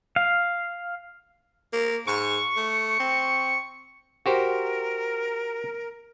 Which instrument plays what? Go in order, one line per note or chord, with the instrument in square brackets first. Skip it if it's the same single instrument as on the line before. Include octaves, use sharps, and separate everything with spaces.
[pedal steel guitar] F5
[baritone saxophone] A#3
[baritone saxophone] G#2 [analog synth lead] C#6
[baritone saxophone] A3
C4
[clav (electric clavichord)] F#4 G4 C5 [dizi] A#4